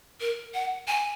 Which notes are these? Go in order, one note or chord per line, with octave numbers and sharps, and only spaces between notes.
A#4
F#5
G#5